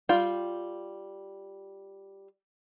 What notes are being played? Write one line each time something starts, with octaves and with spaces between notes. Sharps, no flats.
G3 F4 G5